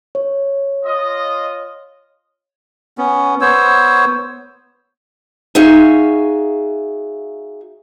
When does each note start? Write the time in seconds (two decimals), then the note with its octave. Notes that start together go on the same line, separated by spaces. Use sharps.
0.15 C#5
0.85 F4 D#5
2.98 B3 C#4
3.41 B3 C5 C#5 E6
5.55 D#4 F#4 G#4 E5 F5